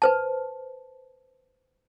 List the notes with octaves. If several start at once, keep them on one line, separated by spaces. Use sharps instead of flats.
B4 C5 A5